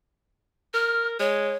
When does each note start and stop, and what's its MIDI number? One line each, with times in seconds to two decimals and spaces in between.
0.74 1.17 70
0.74 1.07 89
1.20 1.56 56
1.20 1.56 73